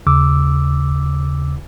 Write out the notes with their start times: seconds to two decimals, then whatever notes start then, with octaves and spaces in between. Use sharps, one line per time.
0.07 D#2 C#3 D6 E6